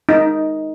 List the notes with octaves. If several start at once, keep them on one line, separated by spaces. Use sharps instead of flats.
D#4